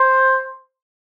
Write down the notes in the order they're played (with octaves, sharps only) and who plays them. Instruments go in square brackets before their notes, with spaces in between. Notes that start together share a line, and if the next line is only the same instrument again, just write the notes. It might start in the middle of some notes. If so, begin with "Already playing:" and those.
Already playing: [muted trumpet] C5